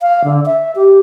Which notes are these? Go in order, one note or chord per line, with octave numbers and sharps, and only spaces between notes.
F5
D3
E5
G4